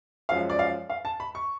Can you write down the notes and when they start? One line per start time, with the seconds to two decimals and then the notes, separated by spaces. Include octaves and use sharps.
0.29 F#2 F3 G#3 F5
0.50 D5
0.59 F5
0.90 F5
1.05 A5
1.20 B5
1.35 C#6